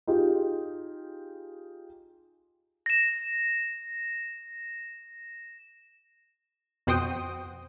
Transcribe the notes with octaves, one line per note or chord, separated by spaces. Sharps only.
D#4 F4 G4 G#4
A#6 E7
F2 B2 F#4 C5 G5 D#6